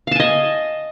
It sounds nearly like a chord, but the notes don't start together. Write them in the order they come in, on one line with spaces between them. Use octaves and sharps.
F5 A5 G#5 D#5